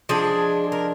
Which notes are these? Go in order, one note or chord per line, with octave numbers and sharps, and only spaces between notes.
F3 G#3 D4 G#4
A#4